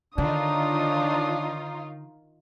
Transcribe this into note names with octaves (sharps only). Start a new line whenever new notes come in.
D3 D#3 D4 D#4 F4 C#5 D#6